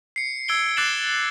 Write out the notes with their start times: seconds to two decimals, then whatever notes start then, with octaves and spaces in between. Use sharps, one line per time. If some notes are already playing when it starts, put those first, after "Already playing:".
0.16 C7 C#7
0.48 E6 G#6 D7 G7
0.77 D6 F#6 A6 C7 E7 F#7